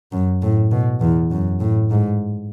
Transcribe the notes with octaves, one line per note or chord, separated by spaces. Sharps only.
F#2
A2
B2
E2
F#2
A2
G#2